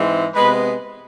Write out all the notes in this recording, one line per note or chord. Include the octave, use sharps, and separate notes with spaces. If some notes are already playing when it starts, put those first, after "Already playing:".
Already playing: G#2 E3 G#3 C4
C3 G#3 B3 B4